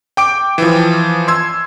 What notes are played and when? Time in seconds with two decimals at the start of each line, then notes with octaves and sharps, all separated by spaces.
0.17 G5 D6 D7
0.58 E3 F3
1.28 C6 E6 G#6